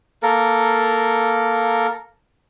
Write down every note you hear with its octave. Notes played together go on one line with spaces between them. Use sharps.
A#3 A4 A#4